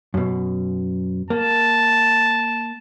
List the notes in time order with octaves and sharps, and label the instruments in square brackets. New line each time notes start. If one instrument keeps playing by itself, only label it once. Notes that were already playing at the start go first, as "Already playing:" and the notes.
[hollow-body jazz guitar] F#2 B2
[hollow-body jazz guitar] A#3 [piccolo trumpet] A5